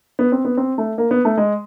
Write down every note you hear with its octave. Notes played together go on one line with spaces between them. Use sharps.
B3
C4
B3
C4
A3
A#3
B3
A3
G#3